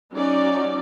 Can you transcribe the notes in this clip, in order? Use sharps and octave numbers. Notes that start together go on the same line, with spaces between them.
F#3 C#4 D#4 D5